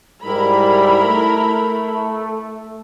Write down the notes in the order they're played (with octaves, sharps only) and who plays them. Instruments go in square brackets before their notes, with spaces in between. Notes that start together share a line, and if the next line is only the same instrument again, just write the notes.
[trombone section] G#2 G3 [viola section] E4 A#4 B5
[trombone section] A3